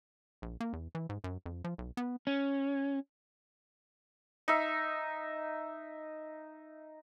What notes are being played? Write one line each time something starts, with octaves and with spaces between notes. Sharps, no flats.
A#1
A#3
E2
E3
G#2
F#2
F2
F3
B1
B3
C#4
D#4 E5